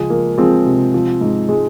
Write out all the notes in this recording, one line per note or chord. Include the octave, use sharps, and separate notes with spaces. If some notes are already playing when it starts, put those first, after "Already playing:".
Already playing: C#2 F3 G#3
F3 A#3
F3 G#3 C4
C3
F3
G#2
G#3